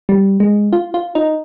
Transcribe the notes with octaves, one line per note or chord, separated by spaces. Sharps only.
G3
G#3
F4
F4
D#4